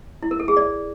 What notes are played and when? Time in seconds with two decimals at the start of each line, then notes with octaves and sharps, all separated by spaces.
0.22 E4
0.31 A#4
0.40 A4
0.48 G#4
0.57 D5